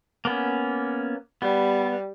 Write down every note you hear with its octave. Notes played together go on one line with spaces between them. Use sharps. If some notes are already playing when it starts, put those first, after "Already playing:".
A#3 B3 C#4
G3 B3